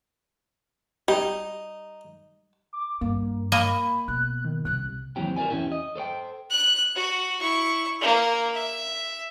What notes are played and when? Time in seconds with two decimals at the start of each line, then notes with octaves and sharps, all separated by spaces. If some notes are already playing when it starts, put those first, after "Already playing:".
1.08 G3 D#4
2.73 D6
3.01 G2 A#3
3.52 A#3 D#5 B5
4.08 B2 F#6
4.45 D#3
4.65 C2 C3 F#6
5.16 D#2 E3 F#3 C4 G4 G5
5.36 F#4 A#4 C#5 D5 G#5
5.50 E2 C3 C#4 E4 G4
5.72 D#5
5.96 A4 C5 C#5 G5
6.50 F#6
6.96 F#4
7.40 E4 C#6
8.01 A#3
8.54 E5